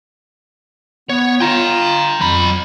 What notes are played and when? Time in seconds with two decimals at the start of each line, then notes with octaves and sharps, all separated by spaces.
1.09 B3 C#5
1.41 F4 G5 A#5
2.21 F2 F#3 B5